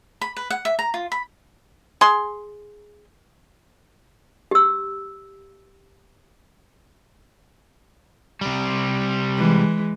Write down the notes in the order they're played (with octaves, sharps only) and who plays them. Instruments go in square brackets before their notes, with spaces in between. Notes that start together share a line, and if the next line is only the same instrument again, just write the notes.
[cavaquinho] B5
B4
F#5
E5
A#5
F4
B5
[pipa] G#4 C6
[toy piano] G4 E6
[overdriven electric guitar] C3 G3
[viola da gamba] E3 G#3